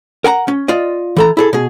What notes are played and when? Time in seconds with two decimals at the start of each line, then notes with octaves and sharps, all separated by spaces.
0.24 A#4 F#5 G#5 A#5
0.48 C#4
0.68 F4 D5 D#5
1.16 E3 A4 A#5
1.37 E4 G#4 A4
1.53 B2 G#4